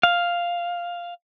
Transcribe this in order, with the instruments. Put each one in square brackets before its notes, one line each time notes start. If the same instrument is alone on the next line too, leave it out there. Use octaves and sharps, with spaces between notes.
[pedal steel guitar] F5